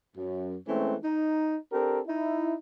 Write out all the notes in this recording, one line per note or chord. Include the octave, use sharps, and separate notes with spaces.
F#2
E3 G#3 A3 C4 C#4
D#4
C4 D4 G4 A4 A#4
D#4 E4